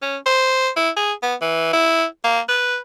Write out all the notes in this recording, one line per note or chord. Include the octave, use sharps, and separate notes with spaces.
C#4
C5
E4
G#4
B3
E3
E4
A#3
B4